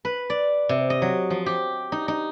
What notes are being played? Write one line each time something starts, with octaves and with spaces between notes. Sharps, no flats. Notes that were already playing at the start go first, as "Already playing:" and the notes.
B4
D5
C3
D#5
F#3
F3
G4
D#4
D#4